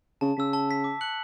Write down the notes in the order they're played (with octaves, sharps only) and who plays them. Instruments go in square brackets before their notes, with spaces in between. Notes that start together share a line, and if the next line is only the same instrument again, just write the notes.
[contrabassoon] C#3 [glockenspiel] A5
[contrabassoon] C#3 [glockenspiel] E6 B6
[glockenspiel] A5
E6 B6
D6
F#6 C#7 F#7